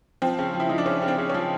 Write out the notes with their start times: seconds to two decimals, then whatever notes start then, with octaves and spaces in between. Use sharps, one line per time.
0.22 F3 C4
0.39 C#3
0.54 F3
0.60 E4
0.69 F3 D#4
0.78 D4
0.86 C#3 C#4
1.02 C#3
1.08 C4 D4
1.18 C#3
1.30 F3 C#4